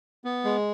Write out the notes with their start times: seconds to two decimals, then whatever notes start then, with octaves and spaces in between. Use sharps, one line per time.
0.24 B3
0.44 G#3